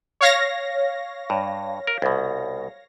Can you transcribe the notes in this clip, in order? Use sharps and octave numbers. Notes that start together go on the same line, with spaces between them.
C#5 F5 A#6
G2
A#4
C2 B2